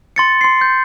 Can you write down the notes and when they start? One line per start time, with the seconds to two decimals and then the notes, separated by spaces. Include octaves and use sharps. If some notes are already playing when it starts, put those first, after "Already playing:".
0.16 C6 A6 C#7
0.41 C6 C7
0.61 G6